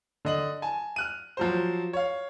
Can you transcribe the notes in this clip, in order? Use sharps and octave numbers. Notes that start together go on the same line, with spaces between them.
D3 D#5 F#7
G#5 A5
F6 F#6 D#7
F3 F#3 C5
C#5 F5